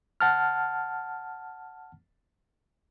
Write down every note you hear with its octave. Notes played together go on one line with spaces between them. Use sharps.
F#5 A5 F6